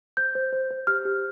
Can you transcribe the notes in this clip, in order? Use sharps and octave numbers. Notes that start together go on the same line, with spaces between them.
C5 G6
C5
C5
C5
G4 F6
G4